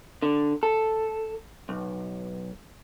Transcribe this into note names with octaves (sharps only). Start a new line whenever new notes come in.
D3
A4
B1